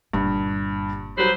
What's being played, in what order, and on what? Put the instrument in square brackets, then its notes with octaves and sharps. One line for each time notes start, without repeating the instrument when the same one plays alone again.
[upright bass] G1 A#2 [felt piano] G2
[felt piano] F#3 G3 [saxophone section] B4 C5